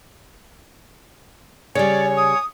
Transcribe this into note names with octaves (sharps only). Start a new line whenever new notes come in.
C#3 G3 C#5 D5 G#5
D#6